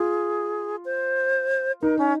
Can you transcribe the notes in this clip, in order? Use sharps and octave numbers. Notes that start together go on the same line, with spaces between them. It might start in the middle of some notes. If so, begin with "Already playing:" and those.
Already playing: F4 G#4
C5
D#4 A#4
C#4